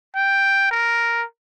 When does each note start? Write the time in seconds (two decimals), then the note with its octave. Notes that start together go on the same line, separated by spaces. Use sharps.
0.15 G5
0.71 A#4